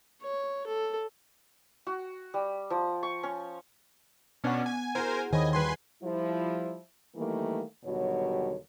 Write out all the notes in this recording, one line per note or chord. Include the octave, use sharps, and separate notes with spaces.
C#5
A4
F#4
G3
F3
C#6
C#4
B2 B3 C#4 D4 F#5
G#5
E4 F#4 G#4 A#4 C5 G#5
D#2 D#3 C5 C#5 D#5 G#5 B5
G3 F#4 B4 G#5 C6
F3 G3 E4
D#3 E3 G3 A3 A#3
D#2 B2 D3 F#3 G3 C#5